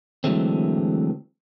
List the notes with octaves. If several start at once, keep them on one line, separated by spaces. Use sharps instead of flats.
D3 E3 F#3 G#3 A3 C4